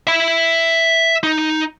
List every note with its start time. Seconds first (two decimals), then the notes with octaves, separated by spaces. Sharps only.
0.07 E5 B5
1.23 D#4